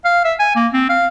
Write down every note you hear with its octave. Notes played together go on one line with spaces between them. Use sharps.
F5
E5
G#5
A#3
C4
F5